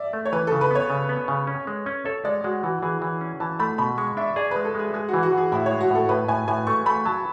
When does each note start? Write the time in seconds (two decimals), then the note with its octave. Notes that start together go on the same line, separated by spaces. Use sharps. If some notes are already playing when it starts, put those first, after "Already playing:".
Already playing: D5 E5
0.13 A3
0.25 C#5
0.32 E3 B4
0.47 C#3 A4
0.61 B4
0.71 B3 C#5
0.90 C#3
1.09 B3
1.28 C#3
1.47 C#4
1.67 G#3
1.86 C#4
2.05 A4 C#5
2.25 G#3 D5
2.44 G#3 F#4
2.63 E3 F#4
2.82 E3 G#4
3.02 E3
3.21 C#4
3.40 E3 A5
3.60 A3 B5
3.78 B2 B5
3.98 G#3 C#6
4.17 D4 E5
4.36 G#4 D5
4.51 G#3 B4
4.65 A4
4.75 G#3 G#4
4.94 G#3 G#4
5.08 E3 F#4
5.23 F#4
5.33 E3 G#4
5.52 A2 E4
5.66 G#3 C#5
5.81 F#4
5.90 A2 A4
6.09 A2 B4
6.28 A2 G#5
6.48 A2 G#5
6.67 A3 C#6
6.86 A3 B5
7.05 F#3 A5